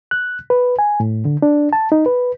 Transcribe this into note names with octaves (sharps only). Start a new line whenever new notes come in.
F#6
B4
G#5
A2
D3
D4
A5
D#4
B4